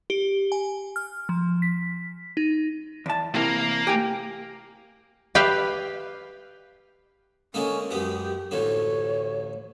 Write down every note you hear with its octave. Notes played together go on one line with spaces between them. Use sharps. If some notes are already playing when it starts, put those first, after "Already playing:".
G4
G#5
F6
F3
B6
D#4
E2 A5
C3 E3 A#3 A#4
G4 G5 G#5
G4 B4 E5 F5 G5
D3 G#3 A#3 C#4
F#2 G#3 B3 G4
A1 D2 D3 C#5